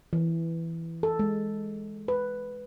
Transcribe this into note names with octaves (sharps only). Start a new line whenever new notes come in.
E3
A4
G#3
B4